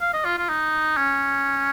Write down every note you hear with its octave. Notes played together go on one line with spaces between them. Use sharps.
F5
D#5
F4
F4
D#4
C#4